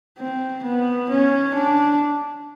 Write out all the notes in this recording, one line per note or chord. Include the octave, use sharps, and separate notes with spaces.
C4
B3
C#4
D4